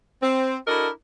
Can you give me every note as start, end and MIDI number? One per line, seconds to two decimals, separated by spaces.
0.22 0.57 60
0.68 0.88 62
0.68 0.88 64
0.68 0.88 66
0.68 0.88 69
0.68 0.88 70
0.68 0.88 75